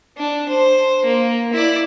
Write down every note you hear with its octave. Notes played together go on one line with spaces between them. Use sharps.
D4
C5
A#3
E4 D5